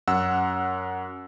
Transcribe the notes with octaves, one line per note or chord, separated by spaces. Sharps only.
F#2 F#5 E6